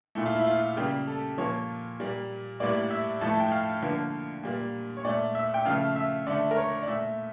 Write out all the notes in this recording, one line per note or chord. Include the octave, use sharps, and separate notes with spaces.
A#2 A3 E4
F4
E4
F4
C#3 G3 A#3 G4
A4
A#2 F3 A#3 C#5
A#2 G3 A#3
A2 G3 A#3 D5
E5
A2 F3 A3 A5
G5
F5
D3 F3 A#3
A#2 G3 A#3
C#5
A#2 A3 D5
E5
G5
C#3 F3 A3 F5
E5
D3 A3 D5
A#4
C#5
D5
A#2 A3 E5